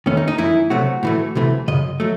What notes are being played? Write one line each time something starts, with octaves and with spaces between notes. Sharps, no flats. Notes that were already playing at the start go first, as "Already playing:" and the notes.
E2 D#3 A3 C#4
D#4
D#4
F#2 E3 A3 E4
C#2 C3 F#3 A3 F#4
A2 E3 A3
C2 C3 E3 A3
F#2 C#3 D#5
F#3 A3